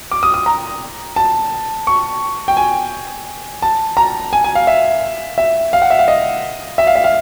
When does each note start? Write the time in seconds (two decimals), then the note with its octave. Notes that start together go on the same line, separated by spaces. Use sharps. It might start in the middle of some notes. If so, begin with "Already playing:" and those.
0.11 D6
0.23 D#6
0.34 D#6
0.46 A#5
1.16 A5
1.87 C#6
2.48 G5
2.57 G#5
3.62 A5
3.97 A#5
4.33 G#5
4.44 G#5
4.55 F5
4.67 E5
5.38 E5
5.73 F5
5.82 F#5
5.90 E5
5.99 F5
6.08 D#5
6.78 E5
6.87 F5
6.95 E5
7.04 F5